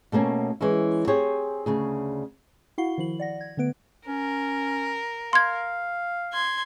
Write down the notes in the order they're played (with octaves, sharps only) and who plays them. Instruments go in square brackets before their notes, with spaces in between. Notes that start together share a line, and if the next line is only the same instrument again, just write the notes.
[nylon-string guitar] B2 A3 A#3 C#4
E3 G#3 C#4 E4
C4 G4 G#4 C5 C#5
D2 C#3 G#4
[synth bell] E4 F#4 F5 F#5 C7 G7
D#3 F3 E4 F#7
D5 F#5 A#6
G#6
D3 A3 B3 B4 D7
[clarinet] C#4 [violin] A#4
[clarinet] F5 [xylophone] C6 G#6
[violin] C6 G#6